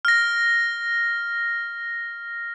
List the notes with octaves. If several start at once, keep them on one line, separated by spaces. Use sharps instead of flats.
F6 A#6